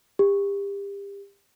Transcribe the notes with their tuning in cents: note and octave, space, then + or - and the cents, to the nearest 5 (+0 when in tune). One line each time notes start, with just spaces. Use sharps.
G4 +30